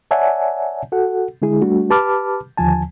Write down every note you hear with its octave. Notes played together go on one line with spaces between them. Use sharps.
C#5 D5 E5 F#5 G#5 A5
F#4 A4 F#5
D3 G#3 E4 G#4
G3 A3 D4 F#4
G4 B4 A5 B5 D6 F6
D#2 D3 F3 G#5 A5